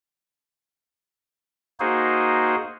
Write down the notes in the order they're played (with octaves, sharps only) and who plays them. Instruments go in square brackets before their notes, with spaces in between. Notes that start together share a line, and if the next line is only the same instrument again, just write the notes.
[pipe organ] A#3 D#4 F#4 G#4 C5